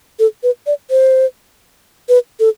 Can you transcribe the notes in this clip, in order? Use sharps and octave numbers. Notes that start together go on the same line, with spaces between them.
A4
B4
D5
C5
B4
A4